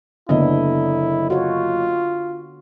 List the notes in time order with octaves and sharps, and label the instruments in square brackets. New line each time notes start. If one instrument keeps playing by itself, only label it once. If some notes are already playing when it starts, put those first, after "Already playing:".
[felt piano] F#1 D#5 [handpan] D3 B3 D4 [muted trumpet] E4
[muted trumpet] F4 [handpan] F#4 C#5